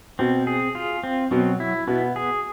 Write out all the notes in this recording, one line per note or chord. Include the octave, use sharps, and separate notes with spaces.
B2 C4
G#4
F4
C4
B2 F#3
E4
B2 B3
G#4